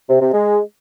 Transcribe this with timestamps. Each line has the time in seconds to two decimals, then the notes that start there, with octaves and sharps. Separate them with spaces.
0.09 C3
0.21 C3
0.32 G#3